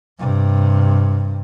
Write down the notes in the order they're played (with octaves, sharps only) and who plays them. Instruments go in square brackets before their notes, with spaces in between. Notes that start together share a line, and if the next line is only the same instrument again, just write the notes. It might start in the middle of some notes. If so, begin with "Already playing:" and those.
[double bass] G2 C3